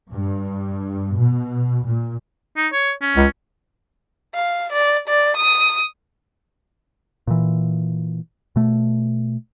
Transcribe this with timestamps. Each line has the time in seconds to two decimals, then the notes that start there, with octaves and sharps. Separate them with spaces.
0.14 G2
1.18 B2
1.84 A#2
2.57 D#4
2.73 C#5
3.02 C#4
3.16 C#2
4.34 F5
4.73 D5
5.09 D5
5.37 D#6
7.27 A#2 E3
8.56 B2 A3